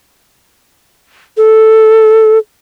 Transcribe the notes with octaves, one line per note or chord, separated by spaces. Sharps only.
A4